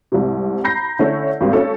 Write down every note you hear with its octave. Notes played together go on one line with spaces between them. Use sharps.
C2 G#2 C3
A#5 B5 G6 A#6 C7
D3 A3 C#4 E4
G#1 G3 A#3 C4
C#4 A4